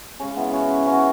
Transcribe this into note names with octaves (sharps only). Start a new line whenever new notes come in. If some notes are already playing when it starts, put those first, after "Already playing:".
C#3 G#3 C#4
B3 E4
C#4 F#4
C#3 E3 G#3 C#4 F#4